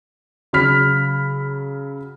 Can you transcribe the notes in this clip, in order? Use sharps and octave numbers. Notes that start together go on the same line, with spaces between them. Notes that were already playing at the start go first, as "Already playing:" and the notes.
C#3 F#3 B5 F6 B6